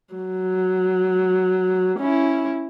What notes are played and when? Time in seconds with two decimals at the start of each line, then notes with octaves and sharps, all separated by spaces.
0.14 F#3
1.99 C#4 E4